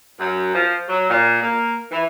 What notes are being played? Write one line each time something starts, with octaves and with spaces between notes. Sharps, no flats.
F#2
F3
F#3
A#2
A#3
E3